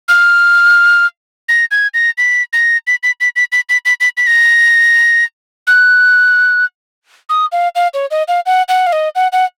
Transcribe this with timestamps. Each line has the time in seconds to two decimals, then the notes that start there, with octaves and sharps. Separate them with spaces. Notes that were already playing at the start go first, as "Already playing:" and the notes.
0.08 F6
1.49 A#6
1.71 G#6
1.94 A#6
2.18 B6
2.53 A#6
2.87 B6
3.03 B6
3.21 B6
3.36 B6
3.52 B6
3.69 B6
3.85 B6
4.01 B6
4.17 B6
4.27 A#6
5.67 F#6
7.29 D#6
7.52 F5
7.75 F5
7.94 C#5
8.11 D#5
8.28 F5
8.46 F#5
8.69 F#5
8.87 F5
8.92 D#5
9.15 F#5
9.32 F#5